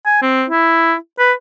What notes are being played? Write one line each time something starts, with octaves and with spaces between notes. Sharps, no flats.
G#5
C4
E4
B4